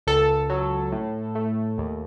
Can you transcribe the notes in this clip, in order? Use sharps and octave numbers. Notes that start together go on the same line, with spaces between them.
C#2 A4
F#3
A2
A3
D#2